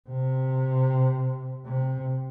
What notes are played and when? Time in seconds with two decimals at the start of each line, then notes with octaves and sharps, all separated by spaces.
0.09 C3
1.66 C3